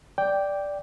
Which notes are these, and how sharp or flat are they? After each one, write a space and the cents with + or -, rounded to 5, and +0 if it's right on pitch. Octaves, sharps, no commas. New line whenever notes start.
D5 -5 G5 +0